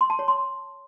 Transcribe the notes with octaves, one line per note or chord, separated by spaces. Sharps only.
C6
A5
C#5
C6